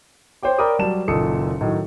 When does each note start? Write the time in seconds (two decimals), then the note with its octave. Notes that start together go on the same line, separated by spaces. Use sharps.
0.43 C5 C#5 G5 D6
0.58 A#4 D5 G5 B5 D6 D#6
0.79 F#3 G3 A5 E7
1.08 F#1 A#2 D#3 A4 D#6 C#7
1.61 A2 D#3 F#3